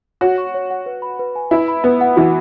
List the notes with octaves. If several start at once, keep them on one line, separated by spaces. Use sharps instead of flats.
F#4 C#5
C#6
C#5
F#5
B4
B5
B4
G#5
E4 B4
B5
B3 B4
F#5
E3 F#4